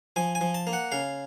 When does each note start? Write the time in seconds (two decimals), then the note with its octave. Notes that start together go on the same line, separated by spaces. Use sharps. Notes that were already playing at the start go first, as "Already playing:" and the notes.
0.16 F3 G#5
0.35 G#5
0.41 F3
0.54 A5
0.67 A#3
0.73 F#5
0.92 C#3 F5